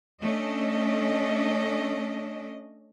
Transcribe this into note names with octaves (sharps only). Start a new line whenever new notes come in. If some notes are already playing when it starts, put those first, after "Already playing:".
A3 C#4 D4 D#5